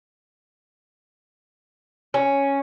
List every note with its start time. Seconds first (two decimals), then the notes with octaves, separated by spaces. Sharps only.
2.14 C#4